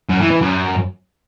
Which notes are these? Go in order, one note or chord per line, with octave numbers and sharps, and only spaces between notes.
F#2
E3
E3
F#2